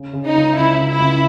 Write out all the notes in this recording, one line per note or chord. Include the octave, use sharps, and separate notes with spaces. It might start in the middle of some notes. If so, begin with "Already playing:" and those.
Already playing: C#3
C#3
D#4
C#2
C#2 E4
C#3
E4
C#2